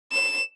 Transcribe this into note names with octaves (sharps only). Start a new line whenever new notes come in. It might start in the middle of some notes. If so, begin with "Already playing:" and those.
E7